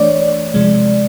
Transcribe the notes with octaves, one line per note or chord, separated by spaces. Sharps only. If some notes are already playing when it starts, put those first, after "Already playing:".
Already playing: E3 A3 D4 C#5 D5
C3 F3 G#3